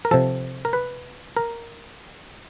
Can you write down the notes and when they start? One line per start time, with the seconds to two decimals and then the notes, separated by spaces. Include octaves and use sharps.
0.05 A#4
0.11 C3 F3 A4
0.65 A#4
0.73 B4
1.37 A#4